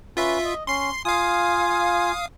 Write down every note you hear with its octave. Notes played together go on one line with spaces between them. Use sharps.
C#4 F4 B4 E5
D#5
C#4 C6 C7
F4 F5 G#5 D#6